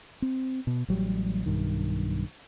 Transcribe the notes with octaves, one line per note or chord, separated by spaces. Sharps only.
C4
B2
A1 F#3 G3
B1 G2 D#3